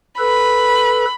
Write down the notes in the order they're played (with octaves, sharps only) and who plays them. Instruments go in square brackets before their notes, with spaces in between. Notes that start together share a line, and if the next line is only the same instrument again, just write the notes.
[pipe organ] A4 B4 [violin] B5